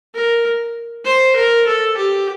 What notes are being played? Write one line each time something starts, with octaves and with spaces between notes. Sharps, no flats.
A#4
C5
A#4
A4
G4